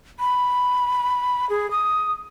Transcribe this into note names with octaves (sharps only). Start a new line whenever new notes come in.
B5
G#4
D#6